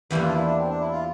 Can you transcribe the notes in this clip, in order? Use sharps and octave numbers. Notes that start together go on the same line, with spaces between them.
E2 E3 G3 A#3 E4
F4
D4
E4
D4
C4
D4
E4
F4